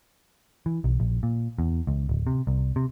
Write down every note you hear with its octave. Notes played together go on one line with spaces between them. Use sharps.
E3
B1
A#1
A#2
E2
C#2
D1
C3
C2
C3